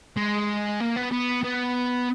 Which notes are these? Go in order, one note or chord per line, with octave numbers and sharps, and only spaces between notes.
G#3
A#3
B3
B3
B3